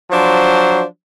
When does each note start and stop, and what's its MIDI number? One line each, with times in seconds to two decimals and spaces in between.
0.11 0.83 53
0.11 0.83 54
0.11 0.83 62
0.11 0.83 72